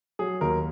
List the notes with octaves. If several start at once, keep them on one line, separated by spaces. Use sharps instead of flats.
F#3 G#4
D#2 A#4